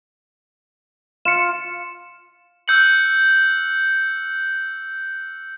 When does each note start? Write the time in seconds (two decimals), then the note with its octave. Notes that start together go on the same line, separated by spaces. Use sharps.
1.25 F4 C#7 E7
2.68 E6 F#6 G6 C#7 F#7